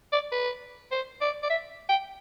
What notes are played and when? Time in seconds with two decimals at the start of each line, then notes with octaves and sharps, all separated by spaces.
0.12 D5
0.32 B4
0.92 C5
1.21 D5
1.43 D5
1.50 E5
1.89 G5